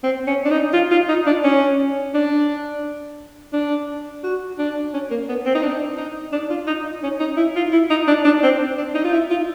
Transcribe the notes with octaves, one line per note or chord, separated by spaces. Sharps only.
C4
C#4
D4
D#4
F4
F4
D#4
D4
C#4
D4
D4
F#4
D4
C#4
A#3
B3
C4
D#4
D4
D#4
D4
F4
D#4
C#4
D#4
E4
F4
E4
D#4
D4
D4
C4
D4
D#4
F4
E4
F4